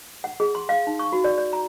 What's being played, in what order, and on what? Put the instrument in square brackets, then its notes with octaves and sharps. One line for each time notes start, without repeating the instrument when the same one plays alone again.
[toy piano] F#5
G#4
C6
F5
D#4
C#6
F#4
D5
D5
A#5